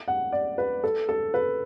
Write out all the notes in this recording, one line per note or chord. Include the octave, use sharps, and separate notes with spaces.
F#5
D5
B4
A4
A4
B4